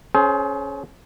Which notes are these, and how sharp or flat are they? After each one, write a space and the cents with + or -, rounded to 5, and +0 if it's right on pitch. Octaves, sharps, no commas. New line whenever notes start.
C#4 +0 G#4 +40 C5 +0